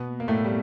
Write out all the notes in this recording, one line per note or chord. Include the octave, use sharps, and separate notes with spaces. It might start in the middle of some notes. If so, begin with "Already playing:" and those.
Already playing: B2 B3
A#3
A2 A3
G3